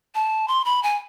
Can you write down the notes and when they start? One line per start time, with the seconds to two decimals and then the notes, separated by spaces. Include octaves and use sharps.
0.15 A5
0.48 C6
0.65 B5
0.83 G#5